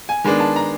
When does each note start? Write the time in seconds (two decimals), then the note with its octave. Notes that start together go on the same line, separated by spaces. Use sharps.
0.09 G#5
0.24 D#3 G#3 B3 D4
0.40 A5
0.56 A#5